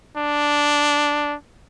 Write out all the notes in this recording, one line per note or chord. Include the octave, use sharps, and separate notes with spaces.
D4